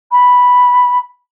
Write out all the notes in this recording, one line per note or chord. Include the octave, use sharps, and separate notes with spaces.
B5